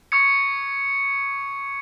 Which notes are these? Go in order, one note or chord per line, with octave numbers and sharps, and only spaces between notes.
C#6 D#6 G#6 C#7